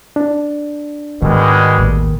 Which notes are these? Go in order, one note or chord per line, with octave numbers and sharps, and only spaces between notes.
D4
G#2 B2 D#3 G3 G#3
A1 D#2